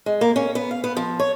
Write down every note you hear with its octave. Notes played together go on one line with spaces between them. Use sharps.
G#3
A#3
C#4
B3
F5
B3
F3
C#5